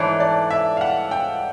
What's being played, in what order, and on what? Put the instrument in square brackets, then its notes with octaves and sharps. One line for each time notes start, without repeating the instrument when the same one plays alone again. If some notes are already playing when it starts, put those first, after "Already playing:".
Already playing: [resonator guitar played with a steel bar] G#2 E3 A3 D4 [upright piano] C#5
[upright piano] D5
E5
F5
F#5
G5